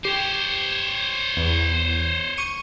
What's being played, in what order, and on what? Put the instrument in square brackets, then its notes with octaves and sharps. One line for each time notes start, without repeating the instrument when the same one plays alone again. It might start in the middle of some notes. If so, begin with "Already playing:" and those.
[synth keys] G4 [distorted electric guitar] C5 C#5
[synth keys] E2
C#6 C#7 D#7